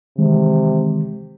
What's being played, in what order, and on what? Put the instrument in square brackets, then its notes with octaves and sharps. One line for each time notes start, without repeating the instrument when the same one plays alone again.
[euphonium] C3 [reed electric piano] D#3 E3 G#3